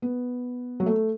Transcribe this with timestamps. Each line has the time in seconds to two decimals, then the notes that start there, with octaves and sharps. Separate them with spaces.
0.02 B3
0.80 F#3
0.86 A3